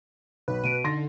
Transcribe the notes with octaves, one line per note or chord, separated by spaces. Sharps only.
B1 B4
B2 D7 D#7
D3 D#4 C6 A6 A#6